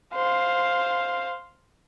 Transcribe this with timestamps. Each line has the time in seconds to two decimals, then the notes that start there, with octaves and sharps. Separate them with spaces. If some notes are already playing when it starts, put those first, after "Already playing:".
0.15 C5 F5